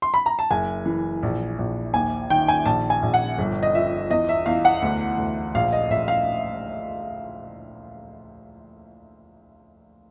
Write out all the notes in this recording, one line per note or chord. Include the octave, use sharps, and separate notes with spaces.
C6
B5
A#5
A5
F#1 G#5
E3
A#1
A#1
D#2 G#5
D#3 G5
G#5
A#1 A5
G#5
A#1
F#5
G1
D#5
F3 E5
E2 D#5
E5
E2 F5
F#5
D2
D2
A#1 F5
D#5
A#1 E5
F5